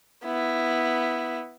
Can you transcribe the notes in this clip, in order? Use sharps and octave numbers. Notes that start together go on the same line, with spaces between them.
B3 E4